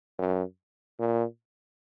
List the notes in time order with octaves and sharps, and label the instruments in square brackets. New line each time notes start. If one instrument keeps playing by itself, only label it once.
[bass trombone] F#2
A#2